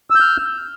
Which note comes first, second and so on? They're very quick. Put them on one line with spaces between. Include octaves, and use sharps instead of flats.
E6 G6 F6